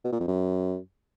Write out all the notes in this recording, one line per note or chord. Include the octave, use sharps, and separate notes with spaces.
B2
A#2
F2
F#2